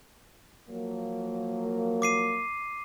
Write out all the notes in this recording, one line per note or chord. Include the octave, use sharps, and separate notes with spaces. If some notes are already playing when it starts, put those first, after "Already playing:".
F3 F#3 A#3
D6 C7 D#7